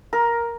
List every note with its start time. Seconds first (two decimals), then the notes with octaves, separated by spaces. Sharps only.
0.13 A#4